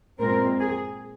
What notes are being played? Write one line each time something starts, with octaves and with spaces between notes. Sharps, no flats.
A#2 G#3 C4 A#4
G#4